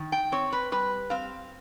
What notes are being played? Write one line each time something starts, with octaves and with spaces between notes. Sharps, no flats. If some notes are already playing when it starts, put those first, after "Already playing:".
Already playing: D#3
G5
C4 C#5
B4
G3 B4
C4 F5